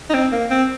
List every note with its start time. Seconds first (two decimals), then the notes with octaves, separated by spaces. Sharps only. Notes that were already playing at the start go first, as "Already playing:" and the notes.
0.10 D#4
0.14 C4
0.32 A#3
0.51 C4